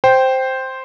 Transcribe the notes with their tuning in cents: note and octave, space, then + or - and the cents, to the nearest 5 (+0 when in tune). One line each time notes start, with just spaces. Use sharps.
C5 +0 G5 -5